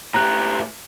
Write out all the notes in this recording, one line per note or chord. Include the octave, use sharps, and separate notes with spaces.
A2 G4 A#5 F#6